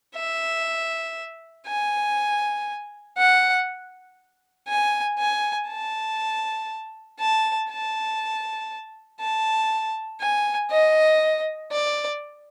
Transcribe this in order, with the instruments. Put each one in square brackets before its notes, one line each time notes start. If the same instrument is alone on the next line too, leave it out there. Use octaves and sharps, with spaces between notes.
[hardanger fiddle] E5
G#5
F#5
G#5
G#5
A5
A5
A5
A5
G#5
D#5
D5